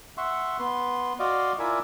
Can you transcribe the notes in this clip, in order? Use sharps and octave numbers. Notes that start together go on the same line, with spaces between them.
E5 F#5 C6 C#6
B3 C6
F#4 D5 D#5 F5 C6
E4 F4 A#4 D5 E5 G#5